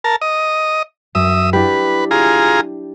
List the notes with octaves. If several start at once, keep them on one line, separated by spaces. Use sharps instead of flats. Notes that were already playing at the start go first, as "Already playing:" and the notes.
A#4 A5
D#5
F#2 E5 D#6
D4 E4 G4 B4
F4 G#4 A#5